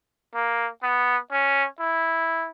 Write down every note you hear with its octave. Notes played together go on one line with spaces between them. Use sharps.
A#3
B3
C#4
E4